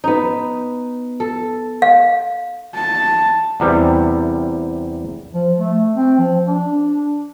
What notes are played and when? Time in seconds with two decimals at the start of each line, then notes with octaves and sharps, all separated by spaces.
0.04 B3 D#4
1.20 A4
1.82 F5
2.75 A5
3.60 E2 C3 G3
5.34 F3
5.59 A3
5.95 C4
6.19 F3
6.47 D4